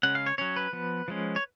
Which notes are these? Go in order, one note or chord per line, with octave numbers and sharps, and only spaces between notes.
C#3 G#3 C#4 F#5
F5
C#5
F#3 C#4 C#5
B4
F3 B3
F3 G#3 C#4
C#5